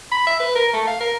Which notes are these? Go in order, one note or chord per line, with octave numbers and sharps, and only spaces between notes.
B5
E5
B4
A#4
A3
F5
A#4